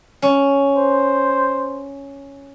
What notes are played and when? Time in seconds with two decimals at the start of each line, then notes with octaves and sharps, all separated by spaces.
0.22 C#4
0.77 C5